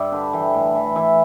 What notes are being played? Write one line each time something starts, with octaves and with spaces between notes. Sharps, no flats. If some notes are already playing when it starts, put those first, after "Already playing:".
Already playing: G2 D5 E5 G5
D3 B4
E3 G5
A2
E3
E3 E5